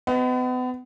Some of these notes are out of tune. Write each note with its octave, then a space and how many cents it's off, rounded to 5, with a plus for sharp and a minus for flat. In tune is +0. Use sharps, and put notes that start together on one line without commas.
B3 +35 D#5 +10